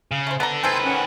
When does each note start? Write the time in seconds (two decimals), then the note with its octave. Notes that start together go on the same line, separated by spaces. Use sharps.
0.11 C#3
0.27 A3 C5
0.40 B3 D4 A4 A#5
0.64 D#3 C4 A4 B4 G#5 C6 G6
0.85 C#4 F#5